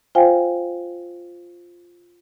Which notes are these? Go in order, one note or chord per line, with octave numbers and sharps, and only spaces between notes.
F4 C5 F5 G5 G#5